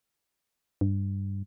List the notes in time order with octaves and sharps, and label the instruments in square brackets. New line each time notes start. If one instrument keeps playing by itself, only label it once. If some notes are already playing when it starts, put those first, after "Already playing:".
[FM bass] G2